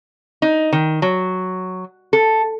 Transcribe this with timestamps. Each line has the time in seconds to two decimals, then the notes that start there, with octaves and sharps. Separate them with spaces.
0.42 D#4
0.73 D#3
1.02 F#3
2.13 A4